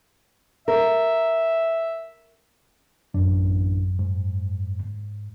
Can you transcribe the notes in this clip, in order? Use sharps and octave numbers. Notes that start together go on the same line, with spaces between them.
A#4 E5
A1 F#2 D4
G#2